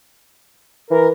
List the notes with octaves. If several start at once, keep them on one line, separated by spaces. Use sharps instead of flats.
E3 A#4